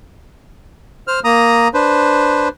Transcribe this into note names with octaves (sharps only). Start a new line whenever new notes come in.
C5 F6
A#3 A#5 D#6
D4 B4 C5